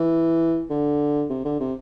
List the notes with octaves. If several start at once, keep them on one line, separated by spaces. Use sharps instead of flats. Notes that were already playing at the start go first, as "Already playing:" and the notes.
Already playing: E3
D3
C3
D3
C3